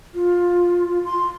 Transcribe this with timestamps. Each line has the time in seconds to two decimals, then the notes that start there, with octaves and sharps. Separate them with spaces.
0.15 F4
1.04 C6